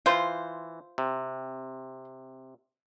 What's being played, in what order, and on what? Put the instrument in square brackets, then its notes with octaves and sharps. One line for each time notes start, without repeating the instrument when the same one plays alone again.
[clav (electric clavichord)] E3 [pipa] F4 C5
[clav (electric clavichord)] C3